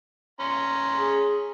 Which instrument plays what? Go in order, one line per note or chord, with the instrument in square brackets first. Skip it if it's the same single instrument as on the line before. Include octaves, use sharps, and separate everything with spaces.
[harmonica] C#4 A#5 C6
[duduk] G#4